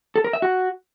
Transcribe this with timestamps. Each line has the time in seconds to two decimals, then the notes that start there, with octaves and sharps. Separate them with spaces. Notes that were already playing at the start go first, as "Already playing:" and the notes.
0.16 A4
0.24 A#4
0.33 E5
0.42 F#4